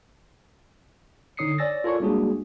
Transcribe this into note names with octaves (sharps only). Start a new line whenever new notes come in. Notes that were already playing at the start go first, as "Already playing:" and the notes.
D3 D#4 C#5 D#6 C7 C#7
C#5 D5 G#5 E6 A6 A#6
F4 A4 A#4 C#5 D5 C#6
G3 G#3 A#3 D4 F#4 G#4